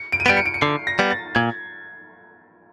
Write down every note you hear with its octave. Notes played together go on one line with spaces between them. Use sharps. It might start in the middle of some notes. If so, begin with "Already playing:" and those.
Already playing: C#7
D7
D#7
G3 B3 D7
C#7
D7
C#7
D3 C7
A#6
G3 B3
A6
A#2 G#6